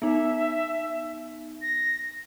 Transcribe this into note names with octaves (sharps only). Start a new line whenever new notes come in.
B3 D#4 E5
A#6